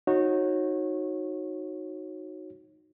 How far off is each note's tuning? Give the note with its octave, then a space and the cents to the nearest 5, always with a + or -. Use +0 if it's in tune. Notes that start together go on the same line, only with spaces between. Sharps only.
D#4 +0 F#4 -10 C#5 -25